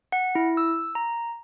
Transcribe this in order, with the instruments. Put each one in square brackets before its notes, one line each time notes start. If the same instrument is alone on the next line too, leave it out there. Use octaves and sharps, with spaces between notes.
[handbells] F#5
E4
E6
A#5